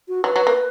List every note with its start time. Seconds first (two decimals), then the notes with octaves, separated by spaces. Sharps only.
0.09 F#4
0.24 F#3 B4
0.36 F#3
0.47 A#3